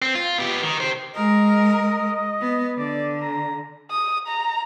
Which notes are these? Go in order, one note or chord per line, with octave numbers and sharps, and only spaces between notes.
C4
F4
B3 G4
D#3
G4 C5
G#3 A#4 D#5
B3
D3 D5
A#5
D#6
A#5